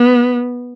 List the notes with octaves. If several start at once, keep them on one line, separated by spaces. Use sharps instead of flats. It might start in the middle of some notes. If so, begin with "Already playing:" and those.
Already playing: B3